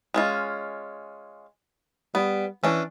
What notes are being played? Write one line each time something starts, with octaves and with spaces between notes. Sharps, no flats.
G#3 C#4 F4
G3 B3
E3 C#4 D4